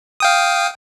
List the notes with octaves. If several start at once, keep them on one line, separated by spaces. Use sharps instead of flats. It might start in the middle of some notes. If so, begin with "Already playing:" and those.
F5 G5 D#6